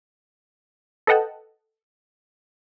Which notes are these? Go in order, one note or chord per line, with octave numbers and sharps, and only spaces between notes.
A4 B4 D#5 F#5 G5 A5